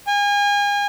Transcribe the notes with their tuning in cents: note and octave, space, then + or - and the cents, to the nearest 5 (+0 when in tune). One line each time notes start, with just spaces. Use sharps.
G#5 -35